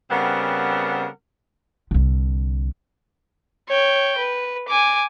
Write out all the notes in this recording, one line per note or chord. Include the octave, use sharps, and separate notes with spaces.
C#3 G3 B3 C4 A#4 F#5
C2 D3
C#5 G5
B4
G#5 D6